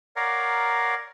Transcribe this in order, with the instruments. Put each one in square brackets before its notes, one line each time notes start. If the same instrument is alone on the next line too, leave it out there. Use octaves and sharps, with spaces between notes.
[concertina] A#4 C#5 D5 F5 F#5 A#5